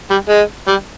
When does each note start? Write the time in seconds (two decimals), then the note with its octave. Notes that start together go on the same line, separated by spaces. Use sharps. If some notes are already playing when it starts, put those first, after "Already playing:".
0.10 G3
0.29 G#3
0.68 G3